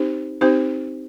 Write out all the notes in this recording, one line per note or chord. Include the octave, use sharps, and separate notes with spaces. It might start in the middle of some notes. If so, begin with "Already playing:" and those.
Already playing: C4 D#4 G4 C5
C4 D#4 G4 C5